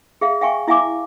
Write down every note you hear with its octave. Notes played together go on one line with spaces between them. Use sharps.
G#4 E5 F5
E5 F5 G5 G#5 C#6
E4 E5 F5 G#5 D6